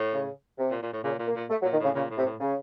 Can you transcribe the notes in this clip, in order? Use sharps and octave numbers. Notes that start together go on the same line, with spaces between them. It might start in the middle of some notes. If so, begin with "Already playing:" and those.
Already playing: A2
C#3
C3
A#2
A#2
A2
A#2 C#3
A#2
A#3
A#2
A3
F#3
A#2
D#3
A2 C#3
A#2 C#3
A2
C3
A2
C#3